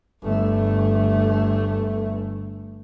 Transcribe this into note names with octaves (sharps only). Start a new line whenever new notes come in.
G1 A3